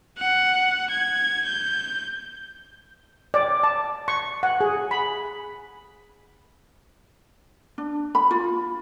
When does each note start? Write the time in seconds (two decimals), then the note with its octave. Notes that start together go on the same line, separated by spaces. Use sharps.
0.18 F#5
0.90 G#6
1.45 G6
3.34 D5
3.63 A5
4.08 C#6
4.43 F#5
4.61 G#4
4.91 B5
7.78 D4
8.15 B5
8.31 F4